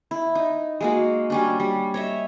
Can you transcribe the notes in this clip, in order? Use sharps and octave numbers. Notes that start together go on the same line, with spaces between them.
E4
D#4
G#3 A#3 F#4
G3 C#4 D4
G3
C#5 D#5 E5